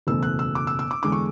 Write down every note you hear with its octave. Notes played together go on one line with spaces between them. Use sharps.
F#1 E2 B2 A3 E6
F#6
E6
D6
E6
E6
D6
E2 D3 G#3 D4 D6
C#6